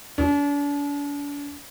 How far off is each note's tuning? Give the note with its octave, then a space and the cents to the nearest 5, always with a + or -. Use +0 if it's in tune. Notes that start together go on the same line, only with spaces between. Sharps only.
D4 -40